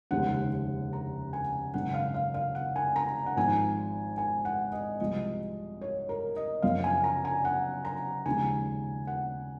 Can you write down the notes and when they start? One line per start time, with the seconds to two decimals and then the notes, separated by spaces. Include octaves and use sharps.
0.11 F1 D#2 C#3 G#3 F#5
0.93 A#5
1.33 G#5
1.74 G#1 F#2 C#3 F#5
1.94 F5
2.14 F5
2.34 F5
2.55 F#5
2.76 G#5
2.96 A#5
3.26 F#5
3.36 G#1 G#2 F3 G#5
4.18 G#5
4.45 F#5
4.72 D#5
5.00 C2 C3 F3 G#3 D#5
5.81 C#5
6.09 A#4
6.36 D#5
6.62 F#1 F#2 F3 F5
6.84 G#5
7.04 A#5
7.25 G#5
7.45 F#5
7.85 A#5
8.25 D#2 C#3 F3 G#3 G#5
9.07 F#5